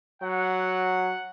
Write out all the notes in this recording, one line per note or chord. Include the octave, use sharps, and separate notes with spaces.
F#3 F#5